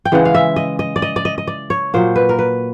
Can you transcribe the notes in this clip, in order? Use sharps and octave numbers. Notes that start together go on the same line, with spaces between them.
G5
C#3 E3 G#3 F#5
F5
E5
D#5
D#5
D5
D#5
D5
D#5
D#5
D5
C#5
A#2 F#3 C5
B4
A#4
B4